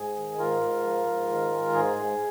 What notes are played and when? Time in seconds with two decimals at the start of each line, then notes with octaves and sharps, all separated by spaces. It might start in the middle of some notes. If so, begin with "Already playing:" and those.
Already playing: G#2 G#4
0.16 D#3
0.38 G#2 F4 A#4
0.61 G#2
0.84 F3
1.06 G#2
1.29 D#3
1.51 G#3
1.73 G#2 G#4
1.96 G#2